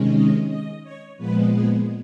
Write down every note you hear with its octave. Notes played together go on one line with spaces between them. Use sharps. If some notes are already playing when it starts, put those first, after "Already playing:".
Already playing: C3 D#3 G#3 C#4
D#5
D#5
C#5
A#2 F3 G#3 B3 B4
G#4